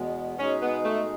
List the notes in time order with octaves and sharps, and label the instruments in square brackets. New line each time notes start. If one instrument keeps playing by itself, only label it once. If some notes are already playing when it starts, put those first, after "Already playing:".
Already playing: [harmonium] E2 B2 G#3 B3
[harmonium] B2 G#3 D#4 G#4 [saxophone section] C#4
[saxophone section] B3
A3